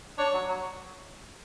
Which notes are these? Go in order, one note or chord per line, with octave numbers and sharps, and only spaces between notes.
D4 C#5
F#3
F#3